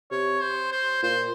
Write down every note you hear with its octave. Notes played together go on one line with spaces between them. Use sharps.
C3 C#5
C5
C5
A#2 C5